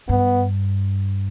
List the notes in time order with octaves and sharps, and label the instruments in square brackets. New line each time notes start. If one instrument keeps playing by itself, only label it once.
[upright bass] G2 [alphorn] B3